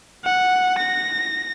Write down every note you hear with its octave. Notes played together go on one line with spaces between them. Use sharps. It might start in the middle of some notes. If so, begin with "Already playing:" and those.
F#5
A#6